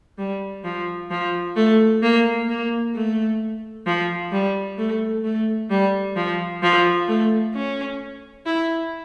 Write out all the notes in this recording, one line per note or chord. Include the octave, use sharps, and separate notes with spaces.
G3
F3
F3
A3
A#3
A#3
A3
F3
G3
A3
A3
G3
F3
F3
A3
C#4
E4